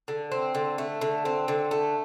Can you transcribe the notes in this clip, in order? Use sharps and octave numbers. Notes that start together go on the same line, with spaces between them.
D3
C4
D3
A3
D3
C4
D3
A3